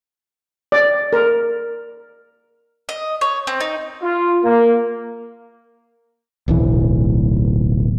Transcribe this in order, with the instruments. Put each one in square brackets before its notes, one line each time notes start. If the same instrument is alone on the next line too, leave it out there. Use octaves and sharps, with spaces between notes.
[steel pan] D5
A#4
[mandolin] D#5
C#5
C4
D#4
[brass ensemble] F4
A#3
[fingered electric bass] D1 B1 E3